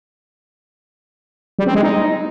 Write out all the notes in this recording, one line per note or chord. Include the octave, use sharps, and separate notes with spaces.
G3
C4
G#3
D#4